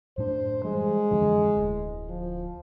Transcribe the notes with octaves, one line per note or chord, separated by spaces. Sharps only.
F#2 A2 D4 C5
E3 G3 G#3
F2 D3 E3
D1
F3